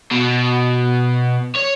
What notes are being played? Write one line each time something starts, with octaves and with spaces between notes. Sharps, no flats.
B2
C#5